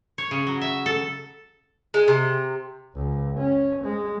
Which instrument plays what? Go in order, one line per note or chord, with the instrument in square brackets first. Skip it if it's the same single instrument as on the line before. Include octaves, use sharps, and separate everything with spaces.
[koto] C#5
C#3
F#3
E5
A4
[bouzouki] G#3
C3
[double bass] C#2
C#4
G#3